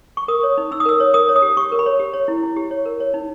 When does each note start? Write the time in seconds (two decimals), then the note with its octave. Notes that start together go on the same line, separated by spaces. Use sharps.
0.17 C#6
0.28 A#4 D#6
0.43 C#5
0.58 D#4
0.71 D#4 E6
0.80 D#6
0.86 A#4 E6
1.00 C#5
1.14 A#4 D#6
1.29 C#5
1.36 D#6
1.42 G4
1.57 G4 C#6
1.72 A#4
1.79 B5
1.86 C#5
2.00 G4
2.14 C#5
2.28 E4
2.43 E4
2.56 G4
2.71 C#5
2.86 A#4
3.00 C#5
3.14 D#4